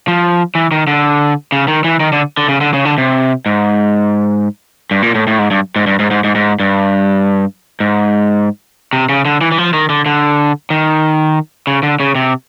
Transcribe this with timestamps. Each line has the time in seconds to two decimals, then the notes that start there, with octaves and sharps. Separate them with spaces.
0.08 F3
0.55 E3
0.71 D#3
0.87 D3
1.52 C#3
1.68 D#3
1.84 E3
2.00 D#3
2.13 D3
2.37 D3
2.49 C#3
2.61 D3
2.74 C#3
2.85 D3
2.98 C3
3.46 G#2
4.91 G2
5.02 A#2
5.15 A2
5.27 A2
5.39 G#2
5.51 G2
5.76 G#2
5.87 G2
5.99 G#2
6.11 G#2
6.24 G#2
6.35 G#2
6.60 G2
7.80 G#2
8.93 C3
9.09 C#3
9.25 D3
9.41 E3
9.52 E3
9.58 F3
9.73 D#3
9.90 D3
10.06 D3
10.70 D#3
11.67 C#3
11.83 D3
12.00 C#3
12.15 C3